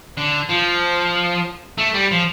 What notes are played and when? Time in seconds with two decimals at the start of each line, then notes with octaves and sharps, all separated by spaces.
0.17 D3
0.49 F3
1.78 A3
1.94 G3
2.11 F3